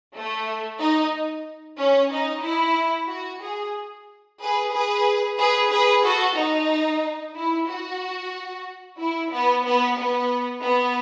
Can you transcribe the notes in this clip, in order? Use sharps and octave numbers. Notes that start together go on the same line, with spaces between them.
A3
D#4
C#4
D#4
E4
F#4
G#4
G#4 B4
G#4 B4
G#4 B4
G#4 B4
F#4 A4
D#4
E4
F#4
E4
B3
B3
B3
B3